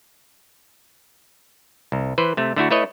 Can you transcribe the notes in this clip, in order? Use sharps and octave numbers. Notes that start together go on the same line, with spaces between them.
C2
E3 B4 C5
C3 A3
D3 A3 E4 F#4
A3 E4 B4 C#5 D#5